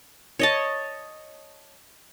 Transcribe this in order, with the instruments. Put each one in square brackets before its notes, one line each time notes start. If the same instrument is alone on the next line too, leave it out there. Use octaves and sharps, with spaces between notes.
[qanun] C#5 D#5 A5